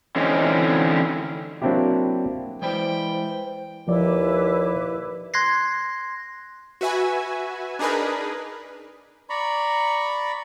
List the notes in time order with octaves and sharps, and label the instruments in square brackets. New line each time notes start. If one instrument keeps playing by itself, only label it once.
[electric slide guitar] D3 E3 C4 C#4 D#4
[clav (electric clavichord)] F#3 A#3 C4 D4 E4 G4
[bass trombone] E3 [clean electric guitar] G#3 D5 B5 [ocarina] C5 [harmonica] G5
[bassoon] D#2 [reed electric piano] F3 D5 [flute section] E4 B4 D6
[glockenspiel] C6 F#6 G#6 A#6 C7
[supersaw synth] F#4 B4 E5 G#5
D4 D#4 G#4 A#4 B4
[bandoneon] D5 A#5 B5 C#6